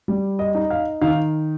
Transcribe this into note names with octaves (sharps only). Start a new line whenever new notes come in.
G3
D#5
D#4
F5
D#3 F5